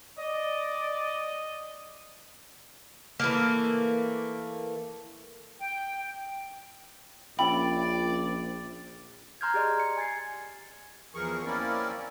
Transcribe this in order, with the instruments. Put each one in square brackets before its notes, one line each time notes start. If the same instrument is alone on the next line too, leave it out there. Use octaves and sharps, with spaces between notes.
[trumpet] D5 [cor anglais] D#5
[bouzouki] E3 A3 A#3
[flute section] G5
[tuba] A#1 [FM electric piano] C#4 F4 E5 [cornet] D5 [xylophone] G5 B5 D7
[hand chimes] A#5 C6 F6 G6 G#6
G4 G#4 D5 D#5
C#7
G#5 G#6 A6 C7
[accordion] E2 E3 F3 G#4 A#4 C#6
A#3 C4 C#4 E4 A#4 D5